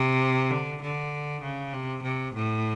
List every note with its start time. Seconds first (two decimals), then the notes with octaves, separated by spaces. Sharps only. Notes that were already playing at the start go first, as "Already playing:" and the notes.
Already playing: C3
0.51 D3
0.82 D3
1.42 C#3
1.73 C3
2.03 C3
2.34 A2